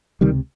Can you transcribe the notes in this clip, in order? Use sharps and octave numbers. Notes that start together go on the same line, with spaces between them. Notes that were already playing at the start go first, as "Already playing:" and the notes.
C#2 C3 D#3 G3